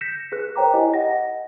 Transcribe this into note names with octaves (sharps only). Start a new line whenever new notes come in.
G6 A#6 B6 C#7 E7
G#4 B4 F#6
A#4 C5 C#5 G5 A#5 D6
E4 G4 D#5 G#5
D#5 F#5 A#6